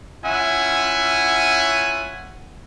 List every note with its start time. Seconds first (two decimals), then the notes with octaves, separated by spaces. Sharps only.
0.24 C#4 E4 F4 E5 F#5 G#5